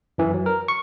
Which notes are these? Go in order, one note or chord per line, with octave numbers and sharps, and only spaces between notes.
F#2 E3
F#3
A#4
C#6